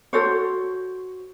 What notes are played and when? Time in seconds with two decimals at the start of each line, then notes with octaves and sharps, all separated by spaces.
0.13 F#4 A4 C5 C#5